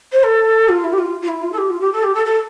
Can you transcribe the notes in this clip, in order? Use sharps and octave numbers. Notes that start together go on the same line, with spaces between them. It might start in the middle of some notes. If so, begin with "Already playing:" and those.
C5
A4
F4
E4
G4
F4
F4
E4
F4
A4
G4
F4
G4
A4
G4
A4
A4